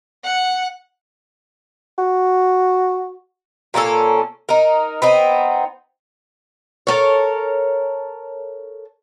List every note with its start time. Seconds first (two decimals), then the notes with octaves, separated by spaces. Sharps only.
0.24 F#5
1.98 F#4
3.74 A#2 A#3 C#4 A4
4.49 D#4 A#4
5.02 B3 C4 D#4
6.87 A4 A#4 C#5